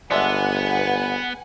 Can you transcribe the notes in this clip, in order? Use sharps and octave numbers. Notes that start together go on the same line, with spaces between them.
G1 G#3 B3 D4 B4 E5 F#5 G#5